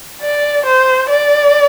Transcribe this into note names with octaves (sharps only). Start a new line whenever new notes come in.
D5
C5
D5